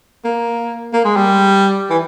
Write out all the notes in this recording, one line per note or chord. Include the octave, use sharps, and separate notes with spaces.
A#3
A#3
G#3
G3
E3